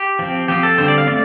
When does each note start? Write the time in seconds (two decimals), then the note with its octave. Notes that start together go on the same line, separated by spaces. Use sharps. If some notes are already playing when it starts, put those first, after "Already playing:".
Already playing: G4
0.19 F3 C4
0.48 F3 C4 G4
0.63 A4
0.78 D3 G3 C4 C5
0.88 D5
0.98 F5
1.07 A3 C4 D5